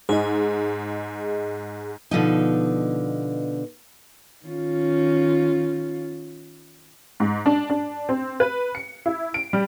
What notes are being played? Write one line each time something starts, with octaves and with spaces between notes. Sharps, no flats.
G#2 G#4 D#5
B2 D3 F3 D#4
D#3 C#4 F4
G#2
D4
D4
C4
B4
C#7
E4
D7
G3